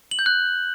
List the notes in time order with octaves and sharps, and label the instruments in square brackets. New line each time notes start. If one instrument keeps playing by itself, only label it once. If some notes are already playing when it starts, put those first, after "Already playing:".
[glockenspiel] F#7
G6
F#6